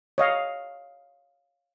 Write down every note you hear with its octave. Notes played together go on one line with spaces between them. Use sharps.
C#5 D#5 F5